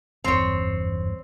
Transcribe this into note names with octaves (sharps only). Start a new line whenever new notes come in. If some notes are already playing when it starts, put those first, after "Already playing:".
F#1 E2 G2 C4 C#5